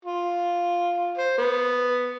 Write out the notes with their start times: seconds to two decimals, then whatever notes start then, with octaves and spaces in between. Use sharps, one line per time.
0.05 F4
1.18 C5
1.38 B3